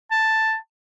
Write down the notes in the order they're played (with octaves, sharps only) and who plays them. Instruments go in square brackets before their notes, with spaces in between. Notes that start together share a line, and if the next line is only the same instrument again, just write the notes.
[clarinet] A5